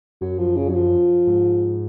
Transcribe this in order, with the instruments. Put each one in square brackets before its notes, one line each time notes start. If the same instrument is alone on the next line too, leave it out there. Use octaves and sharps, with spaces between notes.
[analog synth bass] F#2 [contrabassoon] F#3
[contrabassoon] F3
C#3
F#3
F3
[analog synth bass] G#2